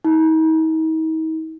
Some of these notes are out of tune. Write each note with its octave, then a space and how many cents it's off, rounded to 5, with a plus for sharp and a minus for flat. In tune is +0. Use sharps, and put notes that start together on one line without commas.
D#4 +40